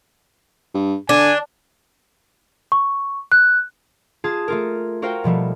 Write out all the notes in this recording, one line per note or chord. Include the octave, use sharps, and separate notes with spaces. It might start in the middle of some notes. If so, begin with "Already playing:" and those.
G2
D3 D4 G#5
C#6
F#6
F4 G#4 A5 D#6 G#6
A3 F4 A#4
F#4 A#4 C5 F5 G5
B2 F3 G3 A3